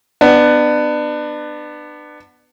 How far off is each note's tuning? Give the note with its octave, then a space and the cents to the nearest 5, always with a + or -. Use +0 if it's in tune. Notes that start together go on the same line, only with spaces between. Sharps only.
B3 +10 D4 +30